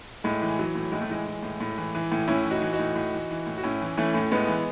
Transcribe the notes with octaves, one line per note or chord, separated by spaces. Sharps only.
A2 G#3
E3
E3 F#3
A2
A2 G#3
A3
E3 G#3
E3
A2
A2
E3
E3
A2
A2 C#4 E4
E3
D#4 F#4
E3
D#4 F#4
A2
A2
E3
E3
A2
F#4
A2 C#4 E4
E3
E3 A3 C#4
A2
A2 G#3 B3
E3